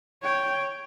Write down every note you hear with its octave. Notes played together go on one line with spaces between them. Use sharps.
C#5 G5